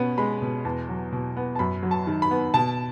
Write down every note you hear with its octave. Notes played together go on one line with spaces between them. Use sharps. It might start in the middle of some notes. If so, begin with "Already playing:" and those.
Already playing: B2 B3 C#4
G#3 B5
B2
E2 A5
F#3
B2
B3
A5
F#2 B5
F#3
A5
D#3
B5
B3
B2 A5